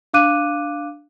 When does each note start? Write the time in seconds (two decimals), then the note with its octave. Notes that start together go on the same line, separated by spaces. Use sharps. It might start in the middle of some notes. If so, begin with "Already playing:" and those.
0.14 D4 F5 D6 F#6 D#7